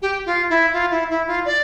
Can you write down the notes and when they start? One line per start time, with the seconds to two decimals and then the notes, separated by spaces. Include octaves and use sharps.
0.01 G4
0.25 F4
0.49 E4
0.73 F4
0.90 E4
1.09 E4
1.26 F4
1.45 D5